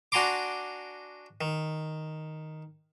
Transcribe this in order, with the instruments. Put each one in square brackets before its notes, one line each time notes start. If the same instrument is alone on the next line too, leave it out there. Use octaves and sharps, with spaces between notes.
[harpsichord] D4 F#4 G#5 A#5 C6 D6
D#3